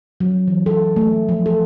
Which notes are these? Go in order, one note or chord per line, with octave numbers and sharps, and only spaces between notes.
F#3
E3
A4
A3
F3
A4